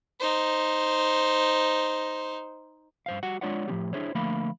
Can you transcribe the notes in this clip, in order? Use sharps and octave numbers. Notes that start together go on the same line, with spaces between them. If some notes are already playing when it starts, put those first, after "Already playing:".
D#4 C5
G2 C5 F5
G3 F#4 F#5
G#3 D4 F4 C#5 D5 F#5
A2 F3 C#4 G4
D4 E4 G#4 C5 C#5
D3 F3 A3 A#3 F5 B5